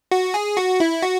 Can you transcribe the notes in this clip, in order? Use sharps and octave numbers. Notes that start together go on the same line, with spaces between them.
F#4
G#4
F#4
E4
F#4